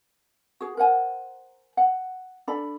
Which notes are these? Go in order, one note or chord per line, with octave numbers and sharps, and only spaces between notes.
F#4 G#4
A#4 C5 F#5 G#5
F#5
D4 A4 D5 B5